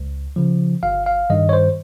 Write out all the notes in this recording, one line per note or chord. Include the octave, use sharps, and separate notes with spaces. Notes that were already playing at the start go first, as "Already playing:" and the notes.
Already playing: C#2
C#3 F3
G1 F5
F5
G2 D#3 G3 D#5
C#5
C5